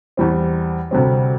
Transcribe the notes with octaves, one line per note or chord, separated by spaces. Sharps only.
E2 E3 G3 C4
D2 C3 G3 C4